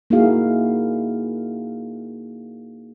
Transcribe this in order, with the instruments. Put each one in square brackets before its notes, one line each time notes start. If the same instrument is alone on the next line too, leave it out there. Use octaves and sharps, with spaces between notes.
[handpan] A#3 D#4 E4 F#4 G#4 F5